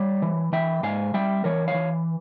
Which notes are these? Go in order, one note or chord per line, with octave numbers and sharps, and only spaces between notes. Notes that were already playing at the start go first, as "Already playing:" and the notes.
Already playing: G3 C#5 F5
E3
E3 E5 G5
G#2 F5 G#5
G3 E5 G5
E3 A#4 C#5
C#5 F5
E3